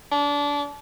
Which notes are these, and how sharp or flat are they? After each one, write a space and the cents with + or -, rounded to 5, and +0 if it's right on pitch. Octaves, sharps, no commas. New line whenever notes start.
D4 -25